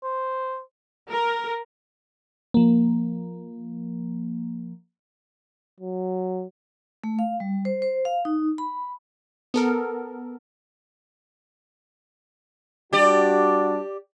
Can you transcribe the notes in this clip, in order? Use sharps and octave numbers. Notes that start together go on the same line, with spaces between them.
C5
A#4
F3 A#3
F#3
A3
F5
G3
C5
C5
F5
D#4
B5
B3 A4 A#4
G3 D4 F#4 G4 D5